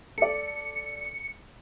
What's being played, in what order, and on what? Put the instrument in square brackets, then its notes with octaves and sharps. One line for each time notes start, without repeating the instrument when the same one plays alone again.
[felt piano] A4 D5 [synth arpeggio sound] C#7